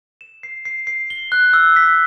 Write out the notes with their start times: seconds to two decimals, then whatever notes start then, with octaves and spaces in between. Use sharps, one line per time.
0.21 E7
0.43 C7
0.65 C7
0.87 C7
1.10 G7
1.32 F#6
1.53 E6
1.76 B6